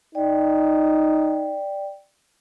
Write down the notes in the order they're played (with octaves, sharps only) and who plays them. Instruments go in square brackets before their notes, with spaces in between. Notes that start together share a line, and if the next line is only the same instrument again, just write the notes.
[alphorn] D#4 [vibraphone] D5 G5